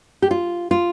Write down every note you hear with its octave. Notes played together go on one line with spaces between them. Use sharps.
G4
F4
F4